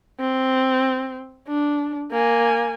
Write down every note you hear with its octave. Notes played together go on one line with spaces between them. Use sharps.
C4
D4
A#3 G#5